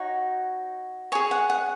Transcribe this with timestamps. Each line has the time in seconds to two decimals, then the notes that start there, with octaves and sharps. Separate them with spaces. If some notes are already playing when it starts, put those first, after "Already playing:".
Already playing: D#4 F#4 C#5
1.12 C#5 G#5
1.15 G#4
1.31 F#5
1.50 F#5